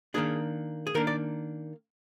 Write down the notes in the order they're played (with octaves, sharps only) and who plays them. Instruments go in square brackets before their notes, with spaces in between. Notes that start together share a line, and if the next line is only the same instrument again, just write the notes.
[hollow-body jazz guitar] D#3 A#3 D4 G#4
G#4
D#3 A#3 D4 A#4
D5